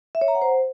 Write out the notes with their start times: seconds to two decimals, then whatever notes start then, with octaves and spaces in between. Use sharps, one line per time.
0.15 E5
0.21 C#5
0.28 A#5
0.35 F#5
0.42 C5